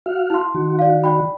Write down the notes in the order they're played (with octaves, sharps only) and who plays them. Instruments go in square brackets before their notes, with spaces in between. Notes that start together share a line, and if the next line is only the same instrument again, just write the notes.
[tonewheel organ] F#4 F5
[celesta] E4 C6
[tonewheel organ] D#3 F#4
[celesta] D5 F5
D5 G5 B5